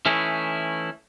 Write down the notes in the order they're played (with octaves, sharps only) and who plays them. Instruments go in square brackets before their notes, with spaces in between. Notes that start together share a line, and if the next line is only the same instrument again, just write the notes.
[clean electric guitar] E3 A3 C#4 D#4 E4